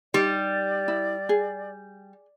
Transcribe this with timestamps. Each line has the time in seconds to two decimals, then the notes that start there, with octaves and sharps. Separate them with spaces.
0.14 G3 D#4 G4 D5
0.88 E4
1.29 G#4